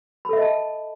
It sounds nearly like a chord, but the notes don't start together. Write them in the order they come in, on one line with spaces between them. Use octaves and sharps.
B5 A4 E5 D#5 A5